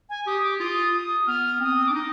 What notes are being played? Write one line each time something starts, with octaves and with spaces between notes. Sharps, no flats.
G#5
G4 D#6
D6
F4 D#6
D#6
B3 F6
C4 D#6
D6
D4
D#4 D#6